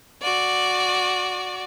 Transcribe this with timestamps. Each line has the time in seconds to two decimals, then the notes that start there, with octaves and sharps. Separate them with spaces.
0.22 F#4 D5